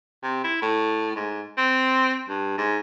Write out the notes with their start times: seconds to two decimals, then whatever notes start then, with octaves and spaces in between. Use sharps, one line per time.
0.23 C3
0.44 E4
0.62 A2
1.16 G#2
1.58 C4
2.29 G2
2.58 G#2